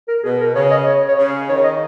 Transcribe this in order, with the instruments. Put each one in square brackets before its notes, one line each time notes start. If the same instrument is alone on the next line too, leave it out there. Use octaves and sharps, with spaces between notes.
[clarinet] A#4
[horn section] B2 [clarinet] G#4
[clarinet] A#4
[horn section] C#3 [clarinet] C#5
[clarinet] D#5
C#5
C#5
[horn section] C#3
[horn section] D#3 [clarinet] C#5
[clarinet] D#5